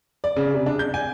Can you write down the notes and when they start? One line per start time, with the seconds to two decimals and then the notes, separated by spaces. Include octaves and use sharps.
0.24 D5
0.36 C#3
0.54 C3
0.66 D4
0.79 G6
0.94 G#5